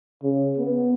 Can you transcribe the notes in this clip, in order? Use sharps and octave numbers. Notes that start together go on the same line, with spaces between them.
C#3
B3